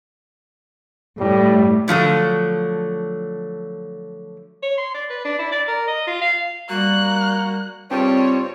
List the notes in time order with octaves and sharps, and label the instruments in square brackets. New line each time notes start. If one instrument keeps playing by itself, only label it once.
[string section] A2 [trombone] G3
[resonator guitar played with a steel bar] D3 F3 F#3 A3
[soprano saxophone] C#5
C6
D5
B4
D4
E4
D5
A#4
D#5
F4
F5
[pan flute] G3 [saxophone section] A#3 F#4 [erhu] F#6
[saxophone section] G2 C#3 G3 [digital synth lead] C4 [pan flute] F4 [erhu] C#5